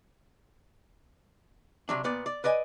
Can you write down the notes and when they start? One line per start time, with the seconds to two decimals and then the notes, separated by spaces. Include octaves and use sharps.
1.89 C3 F#3 D4
2.04 A#2 B3 D5
2.26 D5
2.44 B4 D5 D#5 G#5